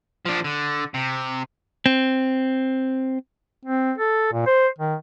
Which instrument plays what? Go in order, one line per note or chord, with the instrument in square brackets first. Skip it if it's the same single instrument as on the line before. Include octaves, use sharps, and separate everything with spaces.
[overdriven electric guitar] F3 D4
D3
C3
[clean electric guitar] C4
[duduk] C4
A4
A#2
C5
D#3